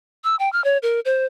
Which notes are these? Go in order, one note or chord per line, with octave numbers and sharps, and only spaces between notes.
E6
G5
F6
C#5
A#4
C5